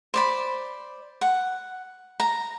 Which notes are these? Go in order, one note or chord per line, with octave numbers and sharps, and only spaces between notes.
C5 D5 B5
F#5
A#5